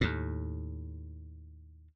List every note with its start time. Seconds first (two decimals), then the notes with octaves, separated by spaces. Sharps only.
0.01 D#2 A2